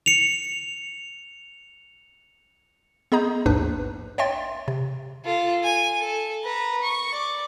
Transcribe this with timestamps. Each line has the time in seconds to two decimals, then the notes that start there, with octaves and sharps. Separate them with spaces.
0.06 C#7 F7
3.12 B3 G#4 D#5 A#5 G6
3.46 A#1 D#2 G#2 D4 B4 F#6
4.18 C#5 D#5 E5 G5 C6 A6
4.68 C3
5.25 F4 A4
5.63 G#5
5.99 A4
6.43 B4 A#5
6.82 C#6
7.11 D5